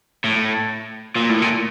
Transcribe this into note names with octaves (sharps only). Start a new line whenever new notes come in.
A2
A#2
A2
A#2